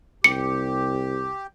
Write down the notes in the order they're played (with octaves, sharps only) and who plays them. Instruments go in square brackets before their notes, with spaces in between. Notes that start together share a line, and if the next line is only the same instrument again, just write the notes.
[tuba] C2 [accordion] G4 [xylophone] C#7